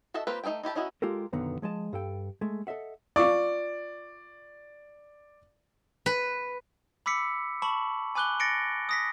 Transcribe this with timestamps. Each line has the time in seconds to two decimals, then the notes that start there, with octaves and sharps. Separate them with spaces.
0.14 F#4 A4 D#5 E5 A5
0.27 A#3 C4 F4 G4 B4
0.43 A3 D#4 G#4 A4 G5
0.63 D#4 E4 G4 A5
0.75 C#4 D#4 E4 F#4 D#5
1.02 G#3 F4 G4 A4 A#4
1.33 B1 F#2 D3 D#3 B3 A#5
1.62 F3 G#3 D#5 A5
1.93 G2 A4 G5
2.41 G#3 A3
2.67 A4 D#5 E5 F#5
3.16 F4 D5 C#6 D6
6.06 B4
7.06 B5 D6 E6 B6 C#7
7.62 A5 B5 C#6 F#7
8.15 G#5 B5 D6 F#6 F#7 G7
8.40 A6 A#6 C#7 D7
8.89 D#6 A#6 B6